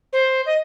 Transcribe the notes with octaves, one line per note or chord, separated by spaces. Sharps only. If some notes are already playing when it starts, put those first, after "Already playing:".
C5
D#5